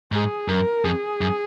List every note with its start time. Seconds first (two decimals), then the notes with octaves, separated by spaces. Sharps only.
0.12 G#2 G#4
0.48 F#2 A#4
0.84 F2 G#4
1.21 F#2